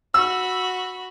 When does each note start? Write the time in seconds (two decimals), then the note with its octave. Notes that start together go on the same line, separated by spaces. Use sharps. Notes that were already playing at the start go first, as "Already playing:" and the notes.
0.14 F#4 B5 E6